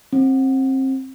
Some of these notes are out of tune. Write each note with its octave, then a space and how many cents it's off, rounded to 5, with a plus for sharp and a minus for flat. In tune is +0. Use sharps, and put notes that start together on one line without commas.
C4 +25